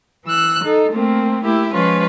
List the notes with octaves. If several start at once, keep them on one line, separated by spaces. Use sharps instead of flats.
E3 E6 F#6
D#4 A4
A3 A#3 C4
A3 A#3 E4 G4
F3 G#3 C#4 F4 B4